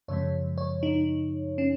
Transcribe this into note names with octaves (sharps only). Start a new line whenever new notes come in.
F#2 C#3 F3 G#3 C#5
C#5
D#4
C#4